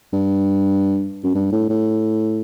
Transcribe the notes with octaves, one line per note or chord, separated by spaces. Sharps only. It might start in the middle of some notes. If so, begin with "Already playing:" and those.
G2
F#2
G2
A2
A2